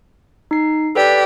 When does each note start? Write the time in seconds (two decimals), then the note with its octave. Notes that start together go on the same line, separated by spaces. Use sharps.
0.51 D#4 C7
0.95 G4 A4 B4 D5